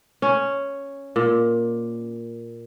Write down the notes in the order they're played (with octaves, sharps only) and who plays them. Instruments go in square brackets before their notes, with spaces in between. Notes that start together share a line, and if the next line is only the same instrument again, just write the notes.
[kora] C#4
A#2